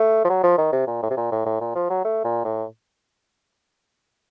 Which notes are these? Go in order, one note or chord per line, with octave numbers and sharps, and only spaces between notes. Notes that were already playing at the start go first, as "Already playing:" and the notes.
Already playing: A3
F3
F#3
F3
D#3
C3
A#2
A2
C3
A#2
A2
A2
A#2
F3
F#3
A3
A#2
A2